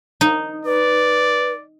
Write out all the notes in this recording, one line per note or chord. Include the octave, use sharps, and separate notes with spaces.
D#4
B4 D5